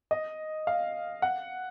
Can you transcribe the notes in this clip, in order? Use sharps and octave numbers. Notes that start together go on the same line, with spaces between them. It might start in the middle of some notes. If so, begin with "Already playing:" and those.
D#5
F5
F#5